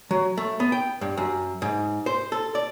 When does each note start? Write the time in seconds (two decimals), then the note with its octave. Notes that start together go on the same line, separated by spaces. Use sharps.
0.11 F#3
0.37 A3
0.60 B3
0.72 G5
1.01 G2
1.17 F#2
1.62 G#2
2.06 C5
2.32 A4
2.55 D5